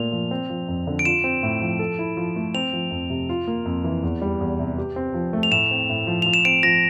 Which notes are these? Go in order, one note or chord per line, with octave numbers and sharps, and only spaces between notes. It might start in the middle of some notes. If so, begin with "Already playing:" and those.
Already playing: A#2 A3 A#3 F7
F3
C4
F3
F2
D3
D7
F4 E7
C4
A2
F3
A4
E4
F3
A3
C4 F7
F3
F2
C3
F4
A#3
F2
E3
E2
G3
E2
C3
G4
C4
F3
A3
F7
A2 E7
C4
A2
F3
F3 F7
E7
C4 D7
F3 A#6